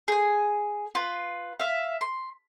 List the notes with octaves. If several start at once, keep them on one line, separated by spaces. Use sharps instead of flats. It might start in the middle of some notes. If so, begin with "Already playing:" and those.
G#4 G#5
F4 B4
E5 F5
C6